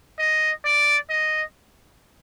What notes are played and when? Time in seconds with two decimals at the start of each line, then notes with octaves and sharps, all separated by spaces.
0.19 D#5
0.65 D5
1.09 D#5